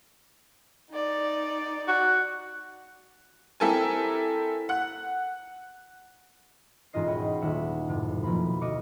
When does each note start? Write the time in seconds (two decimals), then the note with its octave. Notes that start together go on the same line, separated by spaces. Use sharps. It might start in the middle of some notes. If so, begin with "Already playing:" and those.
0.92 D#4 D5
1.87 F#4
3.60 C4 E4 G4 A4 A#4 G#5
4.69 F#5 F#6
6.93 E1 G#2 C#4 F4 D#5 C7
7.07 C#5 D#5 F#5 G5 B5
7.42 D#1 E5 F#5
7.88 F#2 A2 C3
8.24 F2 B2 F3 A3 A#3 B5
8.61 D2 F#4 D#5 D6 F6 C#7